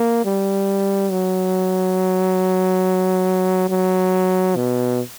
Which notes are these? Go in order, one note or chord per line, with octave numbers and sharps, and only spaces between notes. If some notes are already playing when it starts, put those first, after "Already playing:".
Already playing: A#3
G3
F#3
F#3
B2